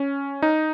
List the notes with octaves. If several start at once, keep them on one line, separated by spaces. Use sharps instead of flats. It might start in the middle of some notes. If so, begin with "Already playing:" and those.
Already playing: C#4
D#4